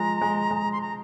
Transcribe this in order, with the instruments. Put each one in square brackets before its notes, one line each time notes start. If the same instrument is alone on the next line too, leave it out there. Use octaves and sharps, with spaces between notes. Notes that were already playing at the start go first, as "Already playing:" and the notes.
Already playing: [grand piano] F3 G#3 [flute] A#5
[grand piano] G#3
G#3
[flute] C6
A#5